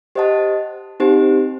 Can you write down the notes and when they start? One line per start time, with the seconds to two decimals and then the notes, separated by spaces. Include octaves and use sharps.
0.15 G4 C5 D#5 F#5 A5
1.00 C4 D#4 G4 C5